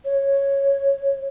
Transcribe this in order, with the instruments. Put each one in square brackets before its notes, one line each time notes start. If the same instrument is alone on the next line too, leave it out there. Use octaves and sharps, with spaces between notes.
[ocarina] C#5